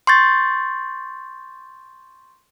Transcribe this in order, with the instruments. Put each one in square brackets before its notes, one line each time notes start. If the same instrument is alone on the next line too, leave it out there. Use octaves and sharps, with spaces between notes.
[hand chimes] C6 C#6 G6 A6